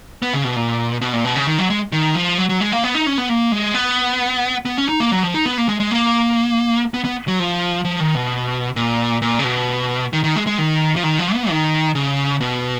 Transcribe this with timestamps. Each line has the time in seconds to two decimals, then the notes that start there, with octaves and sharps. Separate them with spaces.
0.22 B3
0.33 C#3
0.44 B2
0.56 A#2
1.01 B2
1.13 A#2
1.25 B2
1.36 C#3
1.47 D#3
1.59 F#3
1.70 G#3
1.92 D#3
2.15 F3
2.38 F#3
2.49 F#3
2.61 G#3
2.72 A#3
2.84 B3
2.95 D#4
3.07 C#4
3.18 B3
3.29 A#3
3.52 G#3
3.74 B3
4.65 B3
4.78 C#4
4.89 D#4
5.00 A#3
5.11 F#3
5.23 F3
5.34 D#4
5.46 B3
5.58 A#3
5.69 G#3
5.80 G#3
5.91 A#3
6.94 B3
7.05 B3
7.28 F#3
7.40 F3
7.85 F3
8.00 D#3
8.15 B2
8.76 A#2
9.22 A#2
9.39 C#3
9.44 B2
10.13 D#3
10.24 D#3
10.36 G#3
10.47 G#3
10.58 D#3
10.96 F3
11.03 D#3
11.19 F3
11.34 B3
11.50 D#3
11.95 C#3
12.41 B2